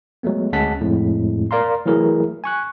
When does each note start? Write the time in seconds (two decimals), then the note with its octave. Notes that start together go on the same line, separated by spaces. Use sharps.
0.23 F#3 G#3 A3 B3
0.53 D2 G#3 C#4 F#5 A5 B6
0.81 F2 A2 G#3
1.51 A#4 D5 F5 A#5 C6
1.86 E3 F#3 A3 E4 G#4 A#4
2.44 G#5 C#6 F#6